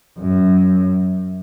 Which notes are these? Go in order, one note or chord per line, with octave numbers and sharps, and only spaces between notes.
F#2